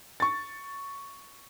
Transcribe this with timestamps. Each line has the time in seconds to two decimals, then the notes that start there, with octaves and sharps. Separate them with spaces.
0.20 C#6 A6